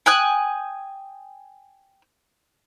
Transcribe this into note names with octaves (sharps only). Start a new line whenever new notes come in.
G5 G#5 D#6 F#6